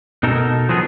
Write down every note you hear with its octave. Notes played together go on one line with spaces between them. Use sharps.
B2 D#4 A4 A#4
F3 F#3 B3 G#4 A#4